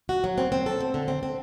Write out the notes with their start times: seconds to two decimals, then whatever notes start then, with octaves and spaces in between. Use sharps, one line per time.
0.09 F#4
0.24 F#3
0.38 C4
0.52 C4
0.66 A4
0.81 C4
0.94 D3
1.08 C4
1.23 C4